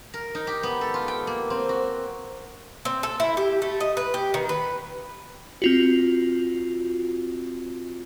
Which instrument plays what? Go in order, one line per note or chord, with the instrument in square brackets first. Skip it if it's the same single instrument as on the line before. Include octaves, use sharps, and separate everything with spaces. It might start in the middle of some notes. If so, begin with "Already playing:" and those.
[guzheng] A#4
D#4
G4
B3
A4
F4
G5
A#3
C4
F#4
[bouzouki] C4
A4
E4
G4
A3
D#5
B4
G4
D#3
B4
[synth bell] C4 F4 F#4